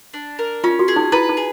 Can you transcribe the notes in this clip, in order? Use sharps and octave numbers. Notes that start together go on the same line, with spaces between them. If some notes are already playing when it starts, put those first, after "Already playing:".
D4
A#4
C#4 F4
F#4
G#4
D#4
E4 B4
D#4
G#4